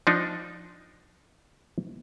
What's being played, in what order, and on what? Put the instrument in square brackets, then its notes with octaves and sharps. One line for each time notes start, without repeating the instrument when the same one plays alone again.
[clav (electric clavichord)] F3 D4 D#4